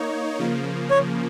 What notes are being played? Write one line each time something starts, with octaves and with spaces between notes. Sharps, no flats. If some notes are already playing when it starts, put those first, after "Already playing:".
Already playing: A#3 D#4 C#5
C#3 F3 A#3
C#5